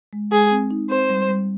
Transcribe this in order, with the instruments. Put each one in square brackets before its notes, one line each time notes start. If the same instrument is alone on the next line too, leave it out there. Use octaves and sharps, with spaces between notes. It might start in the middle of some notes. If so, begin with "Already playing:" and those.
[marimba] G#3
[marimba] G#3 [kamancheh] G#4
[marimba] C4
D#4
[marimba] C4 [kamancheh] C5
[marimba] G3
G3